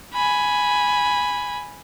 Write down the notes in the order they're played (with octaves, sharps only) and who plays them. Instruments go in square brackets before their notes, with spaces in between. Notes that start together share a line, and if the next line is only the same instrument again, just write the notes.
[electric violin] G#5 B5